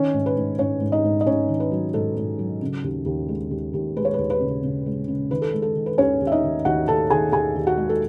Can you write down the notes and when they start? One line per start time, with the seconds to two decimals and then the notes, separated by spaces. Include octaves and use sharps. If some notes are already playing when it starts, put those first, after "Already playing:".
Already playing: D#3 C#4 C#5
0.14 G#2
0.26 B4
0.36 G#2
0.59 G#2 C#4 C#5
0.81 G#2
0.92 D#4 D#5
1.04 G#2
1.21 D#5
1.27 G#2 C#4 C#5
1.48 D#3
1.60 B4
1.71 F#3
1.94 G#2 A4
2.17 G#2
2.39 F#3
2.62 C#3
2.84 D#2
3.06 D#2
3.28 G#3
3.51 D#2
3.73 D#2
3.97 G#3 B4
4.05 C#5
4.14 B4
4.19 D#2
4.30 B4
4.41 C#3
4.63 C#3
4.86 G#3
5.08 C#3
5.30 D#3 B4
5.42 A4
5.53 G#3
5.62 A4
5.76 D#3
5.86 B4
5.98 D#2 C#4 C#5
6.21 D#2
6.27 E5
6.32 D#4 D#5
6.43 D#3
6.65 D#2 F#4 F#5
6.88 D#2 A4 A5
7.10 D#3 G#4 G#5
7.32 D#2 G#4 G#5
7.56 D#2
7.67 F#4 F#5
7.77 G#3
7.89 A4